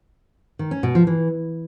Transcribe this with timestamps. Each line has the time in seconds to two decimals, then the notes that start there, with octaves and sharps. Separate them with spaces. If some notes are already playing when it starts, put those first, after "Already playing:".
0.59 D#3
0.71 C#4
0.83 B2
0.95 F3
1.07 E3